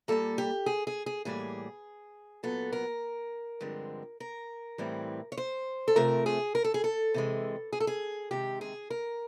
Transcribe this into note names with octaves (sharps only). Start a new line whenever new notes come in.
A#2 G3 A#3 A4
G4
G#4
G#4
G#4
A2 E3 G3 A#3 G#4
A#2 F#3 B3 A4
A#4
G2 D3 F3 G#3 C4
A#4
A2 E3 G3 C4
C#5
C5
A4
C3 F3 A3 C4 A#4
G#4
A#4
A4
G#4
A4
C3 E3 G#3
G#4
A4
G#4
C3 D#3 G#3 G4
G#4
A#4